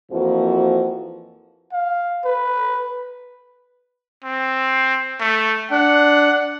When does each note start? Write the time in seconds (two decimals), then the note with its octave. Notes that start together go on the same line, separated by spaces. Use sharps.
0.11 F2 E3 F3 A#3 F#4
1.73 F5
2.25 B4
4.24 C4
5.20 A3
5.71 D4 F#5